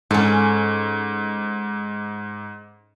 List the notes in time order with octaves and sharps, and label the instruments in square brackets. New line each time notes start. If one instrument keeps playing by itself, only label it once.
[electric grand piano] G#2 [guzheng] C#4 A4